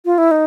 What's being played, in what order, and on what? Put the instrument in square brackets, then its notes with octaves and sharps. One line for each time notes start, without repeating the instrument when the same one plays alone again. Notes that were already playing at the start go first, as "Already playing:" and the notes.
[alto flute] F4
E4
D#4